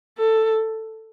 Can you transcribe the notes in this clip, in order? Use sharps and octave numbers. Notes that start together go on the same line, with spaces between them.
A4